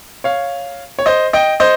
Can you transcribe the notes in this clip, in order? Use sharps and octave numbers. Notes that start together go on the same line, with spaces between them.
C#5 F5
C#5
C5 D#5
D#5 G5
C5 D#5